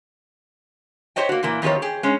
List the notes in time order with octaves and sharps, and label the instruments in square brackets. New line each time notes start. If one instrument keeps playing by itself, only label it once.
[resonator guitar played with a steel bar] G4 C5 C#5 D#5 G5
A#3 F#4
A#2 E3 A#3
E2 D#3 F3 G4 C#5
G4 G#4
G#3 C#4